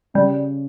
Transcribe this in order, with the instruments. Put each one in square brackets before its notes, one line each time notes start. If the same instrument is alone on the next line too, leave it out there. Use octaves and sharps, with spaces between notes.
[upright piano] C#3 [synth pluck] G3